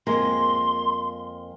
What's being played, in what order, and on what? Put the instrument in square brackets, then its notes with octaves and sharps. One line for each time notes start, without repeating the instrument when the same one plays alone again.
[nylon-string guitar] F2 G#3 A#3 [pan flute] C6